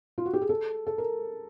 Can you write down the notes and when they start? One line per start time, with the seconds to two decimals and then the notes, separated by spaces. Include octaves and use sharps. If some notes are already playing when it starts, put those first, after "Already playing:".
0.18 F4
0.26 F#4
0.33 G4
0.42 G#4
0.49 A4
0.87 A4
0.98 A#4